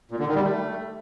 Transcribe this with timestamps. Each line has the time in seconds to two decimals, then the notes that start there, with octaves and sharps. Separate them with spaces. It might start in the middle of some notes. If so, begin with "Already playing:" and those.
0.11 A#2
0.19 D3
0.27 D#3
0.35 G3
0.43 A3